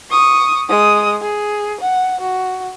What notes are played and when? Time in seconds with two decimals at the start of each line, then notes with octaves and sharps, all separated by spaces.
0.10 C#6 D#6
0.69 G#3 D#6
1.21 G#4
1.80 F#5
2.21 F#4